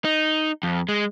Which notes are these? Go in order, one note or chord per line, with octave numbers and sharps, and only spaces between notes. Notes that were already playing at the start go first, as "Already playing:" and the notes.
D#4
F2
G#3